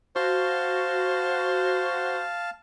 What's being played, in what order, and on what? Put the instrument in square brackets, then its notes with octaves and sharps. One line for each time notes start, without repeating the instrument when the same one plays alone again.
[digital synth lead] F#4 [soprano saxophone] C5 [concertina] F5 A5